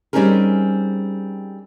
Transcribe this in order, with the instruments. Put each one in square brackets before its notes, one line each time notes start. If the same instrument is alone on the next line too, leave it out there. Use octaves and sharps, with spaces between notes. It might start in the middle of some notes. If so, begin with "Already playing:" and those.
[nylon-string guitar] G3 C4 C#4 D#4 G#4 A#4